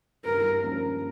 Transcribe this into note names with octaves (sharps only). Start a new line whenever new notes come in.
G2 A#4
F3 A#3 C#4